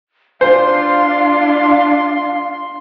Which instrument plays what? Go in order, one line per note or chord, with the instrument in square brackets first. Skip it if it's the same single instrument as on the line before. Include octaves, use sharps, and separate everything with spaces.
[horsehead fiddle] D4 F4 [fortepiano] C5 [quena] F5 [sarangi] C6